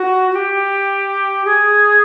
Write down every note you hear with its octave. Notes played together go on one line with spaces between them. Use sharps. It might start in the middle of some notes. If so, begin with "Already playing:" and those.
Already playing: F#4
F#4
G4
G#4